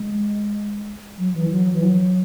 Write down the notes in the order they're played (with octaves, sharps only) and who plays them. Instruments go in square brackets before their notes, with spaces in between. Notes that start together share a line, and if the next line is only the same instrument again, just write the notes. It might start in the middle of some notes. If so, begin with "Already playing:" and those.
Already playing: [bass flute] G#3
F#3
E3
F#3
E3
F#3